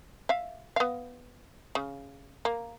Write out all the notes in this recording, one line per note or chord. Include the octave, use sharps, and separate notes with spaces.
E5 F5
B3 F5
C#3
A#3